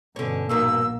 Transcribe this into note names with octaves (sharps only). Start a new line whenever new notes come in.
G1 B2 D3 C#4
A#1 G2 B2 D#3 A#3 E6